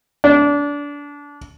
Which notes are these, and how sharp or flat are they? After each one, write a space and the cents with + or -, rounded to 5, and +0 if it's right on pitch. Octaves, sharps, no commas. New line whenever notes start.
D4 -25